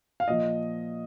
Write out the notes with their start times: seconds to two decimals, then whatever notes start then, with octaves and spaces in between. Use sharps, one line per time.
0.20 F5
0.28 A#2 F3 D#5